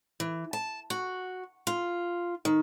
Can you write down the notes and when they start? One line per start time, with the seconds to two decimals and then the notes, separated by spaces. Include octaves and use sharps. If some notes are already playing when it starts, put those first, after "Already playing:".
0.20 E3
0.53 A5
0.90 F#4
1.67 F4
2.45 D#3